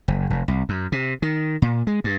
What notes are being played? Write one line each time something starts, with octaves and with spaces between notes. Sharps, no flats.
F#1
F1
C2
F#2
C3
D#3
A#2
G#3
G2